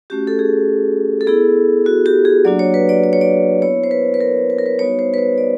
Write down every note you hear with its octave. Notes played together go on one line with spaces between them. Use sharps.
A3 C#4 F#4 G4
A4
G#4
A4
B3 E4 G#4
F#4
G4
G#4
F#3 A#3 D4 F#4 D5
C#5
B4
D5
D5
C#5
D5
B3 E4 C#5
C5
B4
B4
A#4
B4
A#4
B4
G3 B3 D#4 F#4 C#5
C5
B4
C5
D5